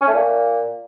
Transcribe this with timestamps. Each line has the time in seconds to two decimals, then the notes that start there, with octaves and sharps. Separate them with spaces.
0.01 C#4
0.07 A3
0.13 A#2